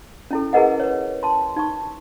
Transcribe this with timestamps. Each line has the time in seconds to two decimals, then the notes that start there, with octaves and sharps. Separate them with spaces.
0.31 C#4 E4 A4
0.53 E4 G#4 A#4 B4 D#5 F#5
0.80 B4 C#5
1.23 A5 C6
1.56 D#4 C#6